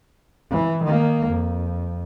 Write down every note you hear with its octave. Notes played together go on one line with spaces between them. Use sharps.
E3
D#3 A#3
F2